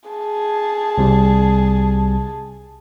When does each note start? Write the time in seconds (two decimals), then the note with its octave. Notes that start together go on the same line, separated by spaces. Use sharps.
0.10 G#4 A5
0.98 C2 C3 G3